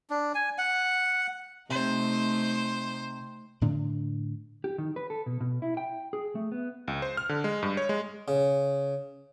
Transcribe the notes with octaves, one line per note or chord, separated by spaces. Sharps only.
D4
G#5
F#5
C3 A3 D#4 C5
A2 D3 D4
G4
D#3
B4
A4
B2
B2
E4
G5
G#4
A3
B3
C#2
C5
F6
D3
G#3
G2
C#5
G#3
C#3